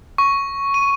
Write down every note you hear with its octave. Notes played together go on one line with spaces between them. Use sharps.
C#6
D#7